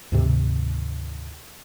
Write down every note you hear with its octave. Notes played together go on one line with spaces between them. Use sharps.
D2 G#2 C3 D#3